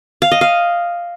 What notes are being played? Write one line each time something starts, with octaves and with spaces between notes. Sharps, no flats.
F5
D#5
F5